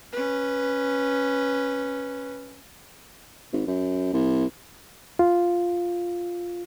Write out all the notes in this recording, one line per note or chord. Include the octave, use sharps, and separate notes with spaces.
C#4 B4
G#1
F#2
C2
F4